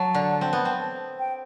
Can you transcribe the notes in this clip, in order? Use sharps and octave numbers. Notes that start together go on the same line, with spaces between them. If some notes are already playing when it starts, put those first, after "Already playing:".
Already playing: F#3 A5
D3
C4
B3
C4
G5